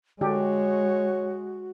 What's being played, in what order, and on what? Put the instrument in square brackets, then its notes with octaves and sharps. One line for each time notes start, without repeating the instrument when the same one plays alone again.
[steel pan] D3 D4 G4 [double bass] G#3 [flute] F#4 [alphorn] C#5